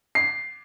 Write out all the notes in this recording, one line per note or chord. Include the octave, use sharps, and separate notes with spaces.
C7